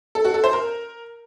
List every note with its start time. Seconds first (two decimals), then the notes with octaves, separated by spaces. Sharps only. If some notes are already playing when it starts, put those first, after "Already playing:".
0.15 A4
0.25 F#4
0.34 A4
0.44 C5
0.53 A#4